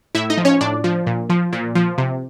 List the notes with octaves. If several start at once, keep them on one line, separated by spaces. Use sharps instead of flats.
A2 E4 E5
D#4 D#5
F3
C#4 C#5
A2 D4 D5
F3
A#2
F3
A#2
F3
C3